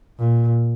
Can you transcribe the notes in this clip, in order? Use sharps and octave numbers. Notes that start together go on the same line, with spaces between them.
A#2